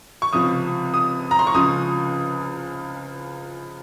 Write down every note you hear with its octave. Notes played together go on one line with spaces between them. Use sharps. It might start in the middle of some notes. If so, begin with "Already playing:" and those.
C#6
C#2 C3 F3 D#6
D#6
A#5
C6
C#6
C#2 C#3 F3 D#6